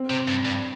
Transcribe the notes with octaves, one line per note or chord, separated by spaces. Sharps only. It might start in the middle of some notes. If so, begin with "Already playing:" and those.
Already playing: C4
C3
G2
G2